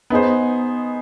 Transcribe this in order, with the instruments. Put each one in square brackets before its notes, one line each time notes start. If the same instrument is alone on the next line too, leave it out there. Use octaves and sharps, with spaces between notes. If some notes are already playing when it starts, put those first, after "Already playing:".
[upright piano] B3 D#4 G#4 C5